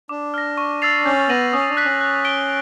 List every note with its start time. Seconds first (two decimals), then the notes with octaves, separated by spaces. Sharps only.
0.09 D4 D6
0.34 F6 A#6
0.58 C#6
0.82 E6 A6 C7 F7
1.05 C#4 G6
1.29 B3 A#6 D#7 F#7
1.53 C#4 D#6
1.70 D4
1.77 F#6 B6
1.85 C#4
2.01 F#6
2.25 B6 D7 G7